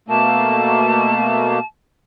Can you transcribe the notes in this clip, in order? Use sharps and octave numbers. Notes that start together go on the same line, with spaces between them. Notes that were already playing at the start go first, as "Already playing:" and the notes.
B2 A3 A#3 A5